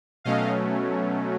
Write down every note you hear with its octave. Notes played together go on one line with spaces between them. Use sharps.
B2 F#3 A3 C#4 D#5 F5